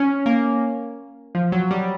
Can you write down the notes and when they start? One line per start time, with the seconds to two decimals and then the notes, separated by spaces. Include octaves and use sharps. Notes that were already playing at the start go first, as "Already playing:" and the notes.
Already playing: C#4
0.26 A#3
1.35 F3
1.52 F#3
1.71 G3